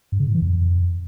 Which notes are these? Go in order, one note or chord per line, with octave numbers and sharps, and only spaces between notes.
G2
C#3
A2
E3
F2